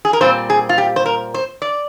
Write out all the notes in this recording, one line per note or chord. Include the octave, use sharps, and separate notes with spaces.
G#4
A#4
A#2 G3 C4 C5
G#4
F4
G4
C5
A#4
C5
D5